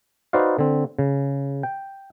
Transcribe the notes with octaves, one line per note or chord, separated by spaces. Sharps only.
D#4 F#4 B4 C5 D5 F5
D3 C4
C#3
G5